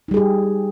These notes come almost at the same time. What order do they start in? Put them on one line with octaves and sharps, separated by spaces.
D#4 G3 G#4 G4